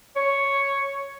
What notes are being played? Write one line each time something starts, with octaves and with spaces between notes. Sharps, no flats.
C#5